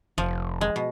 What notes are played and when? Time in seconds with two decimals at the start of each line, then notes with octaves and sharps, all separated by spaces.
0.18 F1 F3
0.61 G#3
0.76 B2